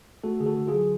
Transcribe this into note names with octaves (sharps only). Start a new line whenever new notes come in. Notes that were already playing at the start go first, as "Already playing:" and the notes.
A3 F#4 A4
D3 G#4
F#4 A4
D3
F4 G#4
F#3